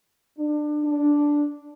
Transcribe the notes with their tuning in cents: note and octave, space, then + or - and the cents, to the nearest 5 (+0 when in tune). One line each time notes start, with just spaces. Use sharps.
D4 +25
D4 -5